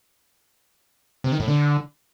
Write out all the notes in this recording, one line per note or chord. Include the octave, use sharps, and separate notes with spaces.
C3
D#3
A2
D3